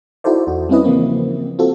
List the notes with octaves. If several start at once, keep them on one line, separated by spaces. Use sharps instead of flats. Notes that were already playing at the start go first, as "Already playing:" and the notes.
D#4 E4 F#4 A4 C5 D5
E2 F#4
G3 C4 C#4 E4 B4 D#5
C#3 E3 F3 A#3 C4
C4 F4 F#4 A4